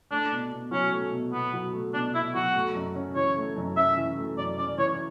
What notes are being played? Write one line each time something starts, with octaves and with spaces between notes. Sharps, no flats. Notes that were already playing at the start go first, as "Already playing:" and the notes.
A3 D4
B2
B2
F#3 C#4
A3
B2
B2 B3
F#3
A3
B2 D4
B2 E4
F#3 F#4
A3
F#2
C#4
E3 C#5
A3
F#2
C#4 E5
E3
A3
F#2 D5
C#4 D5
E3 C#5